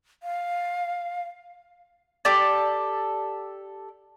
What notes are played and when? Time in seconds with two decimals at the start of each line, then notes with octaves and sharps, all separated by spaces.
0.23 F5
2.25 G4 A4 D5